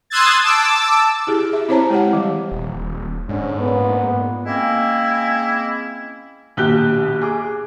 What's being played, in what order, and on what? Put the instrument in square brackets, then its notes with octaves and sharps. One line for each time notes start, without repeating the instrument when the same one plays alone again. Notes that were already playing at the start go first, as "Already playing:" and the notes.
[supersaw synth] C6 D#6 E6 F#6 G#6 A6
A5 D6 E6
[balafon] E4 G4 G#4
E5
C4 E4 C5 C#5 A5 A#5
G#3 E4 G4 F#5
E3 G3
[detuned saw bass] D#1
[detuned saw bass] G#2 [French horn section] D3 C#4
[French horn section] A#2 B3
[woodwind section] G#3 A#3 C4 C#4 E4
[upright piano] A#1 D#2 B2 G4 F#6 G7
G#4 D6